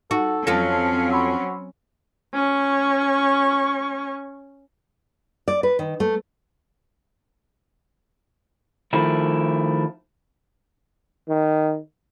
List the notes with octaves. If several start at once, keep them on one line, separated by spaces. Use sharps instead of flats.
D#4 F#4 A4 F#5 C#6
F2 F#3 C4 C#4 F4 A4 F5 A#6
F#4 B5 C6 E6
C#4 C#6
D5
B4
D#3
A3
D#3 F3 A3 E4 A#4
D#3